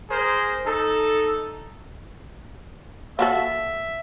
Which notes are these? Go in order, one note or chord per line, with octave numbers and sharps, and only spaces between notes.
G#4 A#4 C5
D#4 A4
A#3 F#4 A4 E5